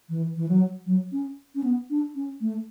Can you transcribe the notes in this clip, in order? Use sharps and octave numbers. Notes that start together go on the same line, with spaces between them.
E3
E3
F#3
F#3
C#4
C#4
B3
D4
C#4
A3